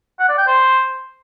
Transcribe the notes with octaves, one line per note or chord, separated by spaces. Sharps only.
F#5
D5
G5
C5